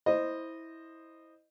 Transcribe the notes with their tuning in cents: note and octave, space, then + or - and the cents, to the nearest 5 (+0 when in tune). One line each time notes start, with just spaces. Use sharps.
E4 -15 C5 +0 D#5 -15